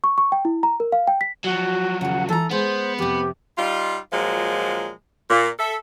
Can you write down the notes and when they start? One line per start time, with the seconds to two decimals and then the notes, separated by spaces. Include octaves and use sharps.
0.04 C#6
0.18 C#6
0.32 G5
0.45 E4
0.63 A#5
0.80 A#4
0.92 F5
1.07 G5
1.21 B6
1.44 F3 F#3 F#4
2.01 D#2 C#3 F#5
2.29 E3 A4 A#5
2.51 G#3 B3 C5
2.98 F2 C3 G4
3.57 G3 D#4 F4
4.12 A#2 F3 F#3 G#3
5.30 A#2
5.59 A4 E5